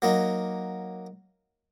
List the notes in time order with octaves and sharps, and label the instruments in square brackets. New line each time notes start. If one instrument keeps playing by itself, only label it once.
[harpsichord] F#3 A#3 D#4